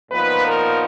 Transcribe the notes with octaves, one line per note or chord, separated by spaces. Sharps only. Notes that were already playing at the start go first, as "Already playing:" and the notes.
A#2 F3 B3 D#4 B4
A#4